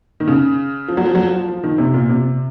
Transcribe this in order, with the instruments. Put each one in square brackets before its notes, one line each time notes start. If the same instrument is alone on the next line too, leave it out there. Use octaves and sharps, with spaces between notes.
[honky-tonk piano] D#3
C#3
F3
F#3
F3
F#3
F3
F3
D#3
C3
A#2
C3